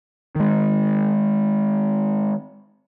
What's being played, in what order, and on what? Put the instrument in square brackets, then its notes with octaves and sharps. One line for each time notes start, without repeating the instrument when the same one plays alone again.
[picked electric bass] D#3 G#3